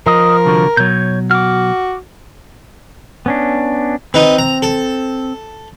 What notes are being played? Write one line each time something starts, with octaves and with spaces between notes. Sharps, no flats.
F3 A#4 D#5
C2 D3 F#4
B2 F#3 C#5 G6
F#4 D6 F6
B3 C#4 D4
C4 D#4 B4
A#5
A4